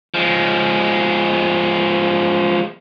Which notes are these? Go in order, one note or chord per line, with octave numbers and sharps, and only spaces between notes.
F3 G#3